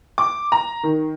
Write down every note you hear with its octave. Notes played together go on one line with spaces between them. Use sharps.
D6
A#5
D#3